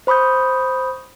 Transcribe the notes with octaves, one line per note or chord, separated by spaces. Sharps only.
C5 B5 C#6 D#6 G6